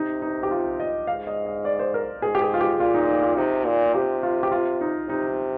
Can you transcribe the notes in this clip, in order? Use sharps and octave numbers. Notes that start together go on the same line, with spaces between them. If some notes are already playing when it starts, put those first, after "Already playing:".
Already playing: C3 D#4
D#4
G4
F4
D#5
G#2 F5
D#5
D#5
D5
C5
A#4
G#2 G#4
G4
G#4
F4
G4
A#2 F4
D#4
D#4
F4
C3 D#4
A#2
F4
C3 G4
F4
G4
F4
D#4
C3 D#4
D#4